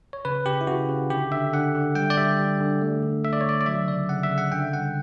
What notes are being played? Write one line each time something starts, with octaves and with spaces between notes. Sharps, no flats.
C#5
C#3 B4
C#3 G4
E4
C#3 F#4
C#3
D3 G4
D3 E5
D3 F#5
D3
G3 G5
D5
G3 E5
G3
D3
A3
D3
A3 E5
D5
C#5
D3 D5
D5
F#3 E5
C#3 D5
C#3 F#5
E5
C#3
F#5
D3 G5
G3 F#5